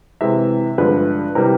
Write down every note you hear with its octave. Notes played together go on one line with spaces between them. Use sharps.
C3 E3 G#3 E5
G2 D3 F3 G#3 B4
C3 E3 G3 A#4